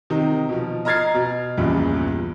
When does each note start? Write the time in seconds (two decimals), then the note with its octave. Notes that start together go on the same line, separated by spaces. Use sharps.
0.10 C3 D#3 D#4
0.49 B2 F3
0.85 D#5 A#5 F6 G#6 A6 C7
1.14 B2
1.57 A#1 E2 G2 A#2 C#3